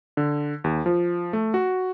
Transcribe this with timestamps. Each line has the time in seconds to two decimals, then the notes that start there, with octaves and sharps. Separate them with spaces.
0.17 D3
0.64 D#2
0.86 F3
1.33 A3
1.54 F#4